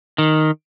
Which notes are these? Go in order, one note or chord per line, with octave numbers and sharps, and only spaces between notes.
D#3